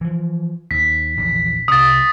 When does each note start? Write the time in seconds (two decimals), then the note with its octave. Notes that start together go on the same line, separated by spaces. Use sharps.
0.01 E3 F3
0.71 D#2 B6
1.17 A#1 E2 D3
1.68 C2 C3 D#6 A6